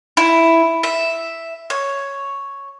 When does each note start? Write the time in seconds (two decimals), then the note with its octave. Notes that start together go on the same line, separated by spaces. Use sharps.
0.17 E4
0.83 E5
1.70 C#5